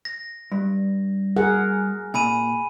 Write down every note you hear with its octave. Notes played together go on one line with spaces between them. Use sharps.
A#6
G2
G#4 A#4 F#5
A#2 G#5 B5 D#7